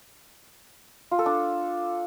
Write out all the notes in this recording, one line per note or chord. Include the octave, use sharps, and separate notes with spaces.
F4
A4
D4